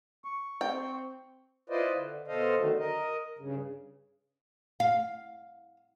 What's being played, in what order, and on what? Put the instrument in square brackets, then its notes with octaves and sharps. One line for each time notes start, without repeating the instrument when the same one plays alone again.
[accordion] C#6
[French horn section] C4 [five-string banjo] G5
[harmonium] E4 F4 B4 C5 D5 D#5
D3
B2 A4 C5 D#5 F5
D3 D#3 F#3 A3
A#4 D#5
G2 C#3
[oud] F5